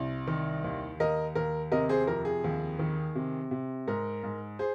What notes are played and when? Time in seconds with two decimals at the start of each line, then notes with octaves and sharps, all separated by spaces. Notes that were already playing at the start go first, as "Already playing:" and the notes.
Already playing: C2
0.27 D#3
0.64 D#2
1.00 D#2 A#4 D#5
1.35 D#2 A#4
1.72 C3 A#4 D#5
1.89 G#4 C5
2.07 F2 A#4
2.25 G#4
2.44 D#2
2.79 D#3
3.15 C3
3.51 C3
3.87 G#2 A#4
4.23 G#2
4.59 G#4 C5